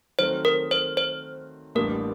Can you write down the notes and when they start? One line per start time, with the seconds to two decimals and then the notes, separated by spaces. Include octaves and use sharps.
0.19 D#3 F#3 A3 C4 C5
0.45 A#4
0.71 C5
0.97 C5
1.75 A1 A2 G3 A#3 D4 A#4